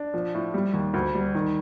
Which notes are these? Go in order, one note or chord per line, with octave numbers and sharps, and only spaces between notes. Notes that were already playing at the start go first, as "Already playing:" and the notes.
Already playing: D4
F3
A2
G3
D#2
D2
G3
D#3